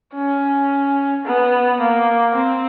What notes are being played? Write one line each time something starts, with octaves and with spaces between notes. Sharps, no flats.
C#4
B3
A#3
C4